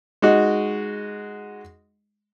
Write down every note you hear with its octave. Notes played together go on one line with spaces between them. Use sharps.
G#3 D#4 F#4